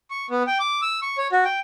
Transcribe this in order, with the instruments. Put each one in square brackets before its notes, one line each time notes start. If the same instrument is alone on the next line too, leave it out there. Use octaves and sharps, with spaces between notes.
[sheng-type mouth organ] C#6
B3
G5
D6
E6
C#6
C#5
F#4
G5